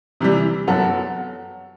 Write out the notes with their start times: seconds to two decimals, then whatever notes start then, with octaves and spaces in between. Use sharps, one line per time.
0.21 C3 E3 G3
0.67 F#2 F#3 B3 F#4 A4